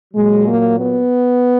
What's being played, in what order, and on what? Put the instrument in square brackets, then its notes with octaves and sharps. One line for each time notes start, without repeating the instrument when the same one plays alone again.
[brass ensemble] A#2 F#3 G#3
A#3
B3